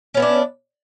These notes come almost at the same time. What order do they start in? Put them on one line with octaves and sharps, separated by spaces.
C#4 B3 E4 D4